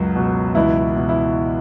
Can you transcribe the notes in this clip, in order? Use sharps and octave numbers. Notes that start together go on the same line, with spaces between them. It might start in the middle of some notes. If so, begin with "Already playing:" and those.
Already playing: C#2 F#2 F#3
B2
C#2 E3 E4
B2
E3 E4